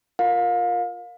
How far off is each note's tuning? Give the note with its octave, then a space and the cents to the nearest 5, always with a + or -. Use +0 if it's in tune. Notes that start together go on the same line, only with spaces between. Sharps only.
F4 +0 A#4 +0 F5 +30